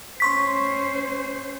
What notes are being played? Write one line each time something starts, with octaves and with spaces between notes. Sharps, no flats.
C#4 C5 C6 C#6 B6